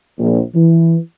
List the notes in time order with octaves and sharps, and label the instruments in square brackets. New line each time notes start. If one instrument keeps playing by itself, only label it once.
[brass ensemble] A#1
E3